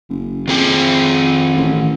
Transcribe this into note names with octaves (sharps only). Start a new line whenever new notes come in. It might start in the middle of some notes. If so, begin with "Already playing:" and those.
F#1
F2 D#3 G#4 G5
A1